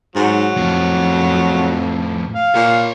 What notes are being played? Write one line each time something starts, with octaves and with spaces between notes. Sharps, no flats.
G#2 F#3
F2 A2 F3
F5
A#2 C#5 C6